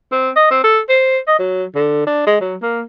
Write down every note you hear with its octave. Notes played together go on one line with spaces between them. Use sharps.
C4
D#5
C4
A4
C5
D#5
F#3
D3
D4
G#3
F#3
A#3